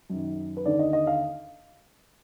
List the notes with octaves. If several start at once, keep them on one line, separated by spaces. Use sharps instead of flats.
F#2 D#3
B4
D#2 D3 D5
D#5
D#5
F5